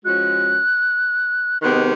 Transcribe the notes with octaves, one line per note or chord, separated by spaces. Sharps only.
F3 G#3 C#4 F#4 F#6
C3 D#3 G#3 B3 F#6